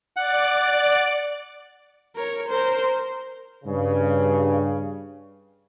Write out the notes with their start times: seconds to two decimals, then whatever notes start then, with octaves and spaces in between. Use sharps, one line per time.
0.17 D5 F#5
2.16 A#4 C#5
2.48 A#4 C5
3.65 G2 C#3